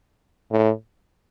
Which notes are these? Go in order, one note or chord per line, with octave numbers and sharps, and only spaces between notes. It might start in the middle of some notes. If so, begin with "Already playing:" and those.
A2